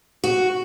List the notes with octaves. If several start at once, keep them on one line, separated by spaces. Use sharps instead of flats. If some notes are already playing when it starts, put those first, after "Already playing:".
F#4